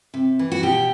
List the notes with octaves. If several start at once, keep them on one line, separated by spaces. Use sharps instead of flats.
C3
E3
F#4
B2 G4